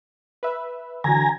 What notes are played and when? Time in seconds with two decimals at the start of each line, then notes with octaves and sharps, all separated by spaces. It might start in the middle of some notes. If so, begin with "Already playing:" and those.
0.43 B4 E5
1.04 D3 E3 F#3 G#5 A#5